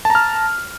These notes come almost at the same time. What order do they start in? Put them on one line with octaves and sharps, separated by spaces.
A5 A#5 F6